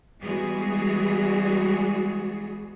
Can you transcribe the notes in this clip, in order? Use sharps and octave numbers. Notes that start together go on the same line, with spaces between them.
E3 G3 G#3 B3 F#4 G#4